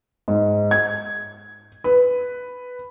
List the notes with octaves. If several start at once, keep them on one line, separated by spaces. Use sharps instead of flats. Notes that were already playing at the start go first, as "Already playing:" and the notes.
G#2
G#6
B4